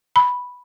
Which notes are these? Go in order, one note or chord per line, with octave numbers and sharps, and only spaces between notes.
B5